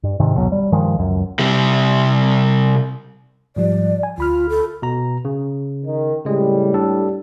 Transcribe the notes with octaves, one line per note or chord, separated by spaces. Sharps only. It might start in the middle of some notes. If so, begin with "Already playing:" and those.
G2
G#2 C3 D#3
E1 B1 B2 F#3
G3
G2 D#3 F3 G#3
C#2 F#2
C3 G3
G#2 F3 G3 D5
G#5
D2 F4 B5 F6
A4
B2 A#5
C#3
D#3
A2 C#3 G3 G#3
D4 A4